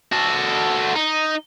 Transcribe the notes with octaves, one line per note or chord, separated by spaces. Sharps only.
F#4 A4
D#4